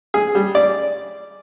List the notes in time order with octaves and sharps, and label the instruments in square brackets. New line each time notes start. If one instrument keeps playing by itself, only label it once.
[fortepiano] G#4
G3
D5